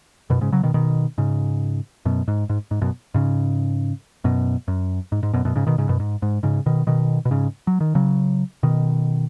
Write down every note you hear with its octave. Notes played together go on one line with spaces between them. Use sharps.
F#2 B2
G#2 C#3
C#3 F#3
B2 D#3
B2 D#3
G#2 C#3
F#2 B2
G#2
G#2
G#2
F#2 B2
G#2 C#3
F#2 B2
F#2
G#2
G#2
F#2 B2
F#2 B2
G#2 C#3
B2 D#3
G#2 C#3
F#2 B2
G#2
G#2
G#2 C#3
B2 D#3
B2 D#3
B2
G#2 C#3
F#3
D#3
C#3 F#3
B2 D#3